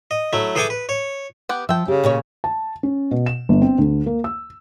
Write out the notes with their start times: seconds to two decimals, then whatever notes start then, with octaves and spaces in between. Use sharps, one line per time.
0.11 D#5
0.33 F#3 A3 E4
0.55 E3 G#4 A4 G5 G#5 D6
0.70 B4
0.89 C#5
1.49 B3 G4 F#5
1.69 F3 E5 G5
1.88 C#3 G4
2.04 A#2 G#4 C#5
2.44 A5
2.83 C#4
3.11 B2
3.26 E7
3.49 G1
3.62 C4
3.78 D2
4.06 A#3
4.24 E6